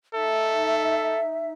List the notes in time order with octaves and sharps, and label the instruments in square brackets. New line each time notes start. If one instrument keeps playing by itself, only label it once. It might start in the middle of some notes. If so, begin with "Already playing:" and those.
[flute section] D#4 E5 [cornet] A4